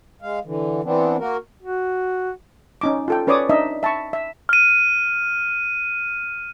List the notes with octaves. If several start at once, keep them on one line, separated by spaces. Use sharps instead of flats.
G#3 F5
D3 E3
E3 B3 C4 D4
A#3 F#4 A#4
F#4
C#4 D#4 D6
F4 A4 G5
C#4 B4 C#5 D5 D6 D#6
D4 D#4 D#5 E5
E5 A5 B5 C#6
E5
F6 D#7